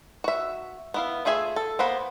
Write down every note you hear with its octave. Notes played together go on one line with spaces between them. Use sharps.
F#4 E5
B3 E4 F5
A3 F4 G#4 E5 G#5
A4
A#3 B3 C5 F#5 B5